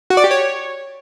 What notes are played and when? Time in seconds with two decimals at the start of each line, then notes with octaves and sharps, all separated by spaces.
0.10 F#4
0.17 D5
0.24 G4
0.31 C#5